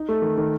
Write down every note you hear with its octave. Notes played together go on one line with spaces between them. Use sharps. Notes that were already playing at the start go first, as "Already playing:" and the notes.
Already playing: D#4
A3
D#3
D#3